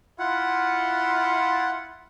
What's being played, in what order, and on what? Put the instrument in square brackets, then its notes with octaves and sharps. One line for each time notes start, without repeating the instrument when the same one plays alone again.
[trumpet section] E4 F4 [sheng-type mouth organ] F#5